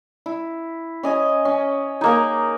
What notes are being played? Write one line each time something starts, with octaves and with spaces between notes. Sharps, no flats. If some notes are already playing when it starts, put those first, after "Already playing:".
E4
C#4 D#5 G#5
C#4
A#3 D#4 G#4 A#4